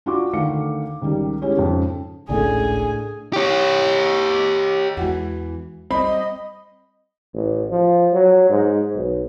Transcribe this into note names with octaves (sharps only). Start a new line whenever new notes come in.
D4 F4 F#4 C#6 D6
D2 D#3 A3 F5 C#7
C#2 D#3 G3
G#3 C#4 E4 G4 C#5
F2 G#2 C#3
G#1 C#2 A2 C#3 D4 G#4 G#5
G4 C#5
E2 E3 G#3 F#4 F#5
G3 C4 D#5 B5
A1
F3
F#3
G#2
B1